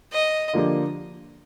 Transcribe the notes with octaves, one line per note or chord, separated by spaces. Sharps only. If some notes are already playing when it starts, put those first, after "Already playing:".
D#5
D3 F3 A#3 D4 G4